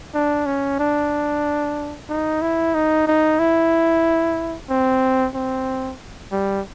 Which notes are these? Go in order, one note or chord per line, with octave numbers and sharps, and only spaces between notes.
D4
C#4
D4
D#4
E4
D#4
D#4
E4
C4
C4
G3